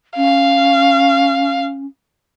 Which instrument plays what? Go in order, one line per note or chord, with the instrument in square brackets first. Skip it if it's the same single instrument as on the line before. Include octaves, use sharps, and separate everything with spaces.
[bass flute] C#4 [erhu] F5